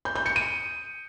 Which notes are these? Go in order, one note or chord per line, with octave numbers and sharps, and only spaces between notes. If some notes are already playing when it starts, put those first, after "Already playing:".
G6
G6
C#7
D#7